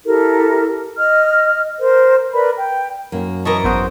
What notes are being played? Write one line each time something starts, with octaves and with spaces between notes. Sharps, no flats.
E4 G4 A4 A#4
D#5 F6
A#4 C5
A#4 B4 D5 B5
G5
F#2 A#3
E3 C4 A#4 D#5 A5 C#6
G#1 B3 F#4 C5 D#6